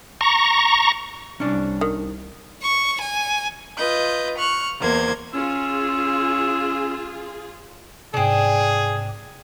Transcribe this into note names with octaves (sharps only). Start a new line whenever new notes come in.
A#5 C#6
C2 C#4 D4
D#3
C#6
G#5
F4 B4 D#5 G6
C#6 F6 F#6
E2 A#3 C5 G#6
C#4 F4 G#4 E6
G#2 C3 C4 D4 G#4